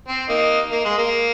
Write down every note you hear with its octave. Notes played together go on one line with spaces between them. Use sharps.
C4
A#3 D#4
A#3
G#3
A#3